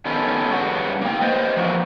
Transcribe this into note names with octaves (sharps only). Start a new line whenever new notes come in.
D#3 B3 C#4 A4
G2 C#3 F#4 F#5
A#3 G5
B4 C5 D#5
F3 A#3 F#4